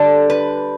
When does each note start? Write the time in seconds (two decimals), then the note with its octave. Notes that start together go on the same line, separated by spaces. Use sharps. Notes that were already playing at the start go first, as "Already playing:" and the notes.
Already playing: D3 G3 D4 A4
0.30 B4